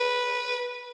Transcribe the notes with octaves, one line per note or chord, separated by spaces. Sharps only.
B4